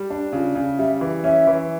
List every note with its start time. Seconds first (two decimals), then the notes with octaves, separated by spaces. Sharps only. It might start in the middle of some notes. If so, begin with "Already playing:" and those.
Already playing: G3
0.10 D4
0.33 C#3 F4
0.55 C#3
0.78 G3 E5
1.01 E3
1.24 C#4 E5
1.47 E3